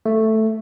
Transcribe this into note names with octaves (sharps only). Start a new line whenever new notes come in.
A3